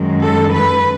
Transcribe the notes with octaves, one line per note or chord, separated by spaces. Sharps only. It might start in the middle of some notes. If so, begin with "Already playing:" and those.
Already playing: F#2 D#3 G#3
A4
B4